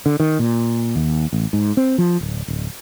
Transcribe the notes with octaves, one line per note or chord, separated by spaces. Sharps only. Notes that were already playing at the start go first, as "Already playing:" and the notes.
D3
D#3
A#2
D#2
A1
G#2
C4
F3
D1
D1